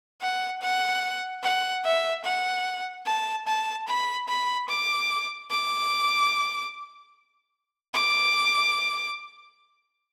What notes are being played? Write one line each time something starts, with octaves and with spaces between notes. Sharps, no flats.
F#5
F#5
F#5
E5
F#5
A5
A5
B5
B5
D6
D6
D6